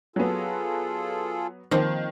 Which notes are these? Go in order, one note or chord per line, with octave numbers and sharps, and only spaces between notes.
F#3 B3 F4 G#4 A4
D#3 F3 A#3 C4